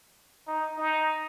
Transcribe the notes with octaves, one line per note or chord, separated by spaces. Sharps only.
D#4
D#4